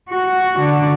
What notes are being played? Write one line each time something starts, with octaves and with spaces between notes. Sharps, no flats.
F#4
D3